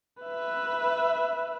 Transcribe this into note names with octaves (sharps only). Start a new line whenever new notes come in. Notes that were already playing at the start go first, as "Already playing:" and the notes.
B4 E5